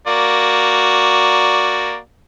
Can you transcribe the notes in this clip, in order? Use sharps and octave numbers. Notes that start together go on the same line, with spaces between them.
A#3 F#4 D5